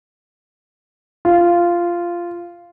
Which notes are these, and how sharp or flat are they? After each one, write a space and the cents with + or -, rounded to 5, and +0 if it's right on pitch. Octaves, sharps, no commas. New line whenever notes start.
F4 -10